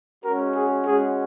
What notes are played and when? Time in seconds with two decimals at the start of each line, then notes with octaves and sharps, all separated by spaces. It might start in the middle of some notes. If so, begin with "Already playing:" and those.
0.23 G#3 C#4 F#4 A#4
0.55 G#4
0.86 G#3 C#4 F#4 G#4